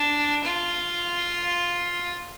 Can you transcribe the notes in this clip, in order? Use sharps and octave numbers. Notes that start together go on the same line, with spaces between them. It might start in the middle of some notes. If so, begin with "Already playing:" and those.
Already playing: D4
F4